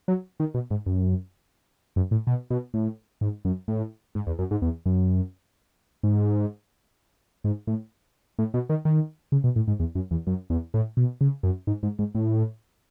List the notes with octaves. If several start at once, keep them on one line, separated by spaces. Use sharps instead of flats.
F#3
D#3
B2
G#2
F#2
F#2
A2
B2
B2
A2
G#2
F#2
A2
G#2
E2
F#2
G#2
E2
F#2
G#2
G#2
A2
A2
B2
D#3
D#3
C#3
B2
A2
G#2
E2
F#2
E2
F#2
E2
A2
B2
C#3
F#2
G#2
G#2
G#2
A2